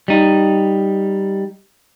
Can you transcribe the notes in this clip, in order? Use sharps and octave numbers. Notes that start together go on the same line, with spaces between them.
G3 D#4